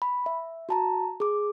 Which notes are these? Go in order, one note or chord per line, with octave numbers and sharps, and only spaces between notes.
B5
E5
F#4 A5 A#5
G#4 D6